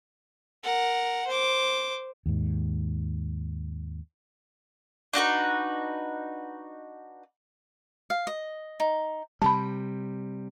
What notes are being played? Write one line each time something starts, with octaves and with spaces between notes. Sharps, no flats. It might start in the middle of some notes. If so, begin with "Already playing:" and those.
A#4 F#5
C5 D6
D#2 G#2
D4 D#4 F#4 B4
F5
D#5
D#4
C3 G3 A5 B5